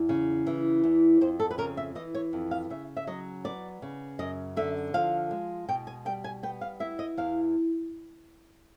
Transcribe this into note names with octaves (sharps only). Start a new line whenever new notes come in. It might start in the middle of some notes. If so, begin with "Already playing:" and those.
Already playing: E2
C#3
E3
E2
F2 C5
A4
B4
C#3 A#4
E5
E3 D#5
C#5
F2
F5
C#3 E5
E5
F#3 D#5
B3 D5
C#3
F#2 D#5
D3 E5
F3 F5
G#3
B2 G5
G#5
G3 G5
G#5
B3 G5
F5
E4 E5
D#5
E2 F5